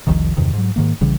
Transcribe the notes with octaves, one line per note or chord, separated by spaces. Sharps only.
F1 C2 D#3 F3
E2 G2 C3 D#3
G#2 F#3
G#2 D#3 A#3
A#1 C#3 E3 G3